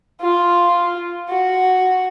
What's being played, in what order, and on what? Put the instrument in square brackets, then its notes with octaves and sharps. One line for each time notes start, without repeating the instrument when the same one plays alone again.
[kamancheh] F4
F#4